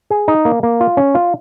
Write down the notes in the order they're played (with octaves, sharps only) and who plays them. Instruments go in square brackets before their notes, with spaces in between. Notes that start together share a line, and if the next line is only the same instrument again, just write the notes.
[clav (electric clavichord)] G#4
D#4
A#3
A#3
F4
C#4
F4